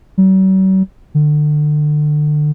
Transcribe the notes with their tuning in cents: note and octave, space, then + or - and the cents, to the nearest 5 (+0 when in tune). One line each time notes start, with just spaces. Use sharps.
F#3 +45
D3 +30